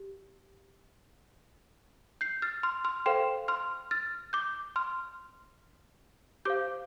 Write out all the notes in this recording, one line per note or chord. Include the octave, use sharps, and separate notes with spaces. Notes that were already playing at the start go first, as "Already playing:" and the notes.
Already playing: G4
G6 C7
F6 A6
C6 F6
C6 F6
A4 C5 F5 G5 C6
C6 F6
F6 A6
D6 G6
C6 F6
G4 C5 F5 D6 G6